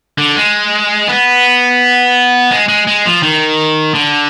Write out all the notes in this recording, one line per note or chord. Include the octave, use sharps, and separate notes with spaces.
D3
G#3
B3
G#3
G#3
G#3
F3
D#3
D3